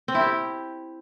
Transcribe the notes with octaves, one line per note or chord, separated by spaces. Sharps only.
C4
E4
G4